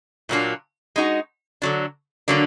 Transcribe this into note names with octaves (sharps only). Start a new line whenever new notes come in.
A#2 F#3 A#3 D4 F4
G#3 D#4 F#4
D3 F#3 D4
D3 F#3 A#3 D4